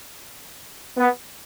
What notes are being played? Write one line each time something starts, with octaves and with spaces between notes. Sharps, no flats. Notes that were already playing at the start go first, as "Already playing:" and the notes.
B3